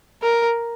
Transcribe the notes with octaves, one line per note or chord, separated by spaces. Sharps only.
A#4